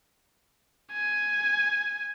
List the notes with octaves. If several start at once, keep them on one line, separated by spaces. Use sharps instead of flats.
G#5